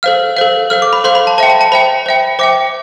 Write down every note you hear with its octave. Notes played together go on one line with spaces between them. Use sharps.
A4 C5 F5 F6
A4 C5 F5
A4 C5 F5 F6
D6
B5
A4 C5 F5 C6
B5
A5
C5 E5 G5 A5
A5
A5
C5 E5 G5 B5
C5 E5 G5
C5 E5 G5 D6